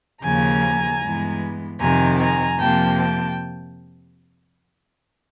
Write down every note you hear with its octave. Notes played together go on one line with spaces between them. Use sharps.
D#2 C#3 F3 A#3 G#5 A#5
G2 E3 G#3 B3
F2 C3 D#3 G#5 A#5
G#5 A#5
F2 C3 F3 A#3 G5 A5
G5 A5